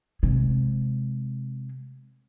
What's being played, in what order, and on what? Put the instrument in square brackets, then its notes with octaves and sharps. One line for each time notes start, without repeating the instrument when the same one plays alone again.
[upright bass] C3 G#3